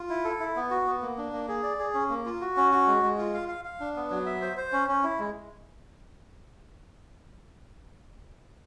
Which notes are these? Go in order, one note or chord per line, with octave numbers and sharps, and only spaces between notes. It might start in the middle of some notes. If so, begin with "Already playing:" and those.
Already playing: F4
E4
A4
E4
B3
F#4
B3
A#3
D4
A#3
G#4
D5
G#4
C#4
A#3
F4
F#4
C#4
F#4
G#3
G#3
F4
F5
F5
F5
D4
B3
F#3
E5
C5
C5
C#4
C#4
E4
G#3